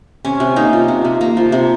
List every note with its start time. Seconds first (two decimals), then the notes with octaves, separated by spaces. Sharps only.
0.25 C3 C#4
0.40 C3
0.56 A#3 D#4
0.73 F3
0.88 C3
1.05 C3
1.21 A#3
1.37 F3
1.52 C3